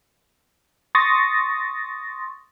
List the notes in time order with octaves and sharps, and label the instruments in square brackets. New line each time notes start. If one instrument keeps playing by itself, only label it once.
[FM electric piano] C6 C#6 D#6 A6 A#6